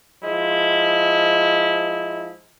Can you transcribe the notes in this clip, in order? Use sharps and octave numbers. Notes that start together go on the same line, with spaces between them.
F3 G#3 E4